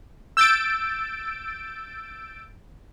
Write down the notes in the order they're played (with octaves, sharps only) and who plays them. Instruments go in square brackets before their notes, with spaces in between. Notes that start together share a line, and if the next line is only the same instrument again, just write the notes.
[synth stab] E6 G6 A6 D7